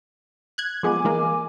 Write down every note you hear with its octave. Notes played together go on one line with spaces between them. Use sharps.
F#6 G#6
F3 G#3 B3 G#5 D6
E3 G#3 A#3